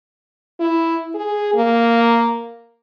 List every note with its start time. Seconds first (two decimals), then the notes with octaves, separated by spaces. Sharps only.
0.60 E4
1.15 G#4
1.54 A#3